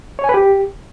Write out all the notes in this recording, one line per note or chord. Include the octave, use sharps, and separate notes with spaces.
C#5
G#5
B4
G4